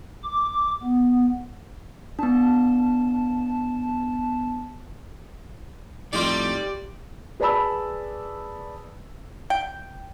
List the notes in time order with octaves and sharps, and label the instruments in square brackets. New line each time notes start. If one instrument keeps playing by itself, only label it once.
[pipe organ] D6
B3
[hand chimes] B3 D4 [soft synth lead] A5
[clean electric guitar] F2 A2 [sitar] G3 [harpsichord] D#4 F4 [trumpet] D5
[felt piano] G#4 B4 D5 A5 B5 E6
[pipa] G5